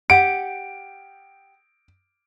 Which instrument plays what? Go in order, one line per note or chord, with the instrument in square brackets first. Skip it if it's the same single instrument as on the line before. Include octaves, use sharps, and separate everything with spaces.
[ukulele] G4 F#5 [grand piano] D7